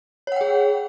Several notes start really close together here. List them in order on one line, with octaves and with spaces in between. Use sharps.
C#5 F#5 G5 G#4